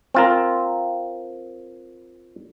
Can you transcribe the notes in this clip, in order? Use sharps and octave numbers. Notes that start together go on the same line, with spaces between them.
C4 F4 A#4